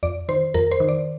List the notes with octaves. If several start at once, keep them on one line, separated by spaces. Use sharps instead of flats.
F2 D5
D#3 C5
F2 A#4
C5
D#3
D5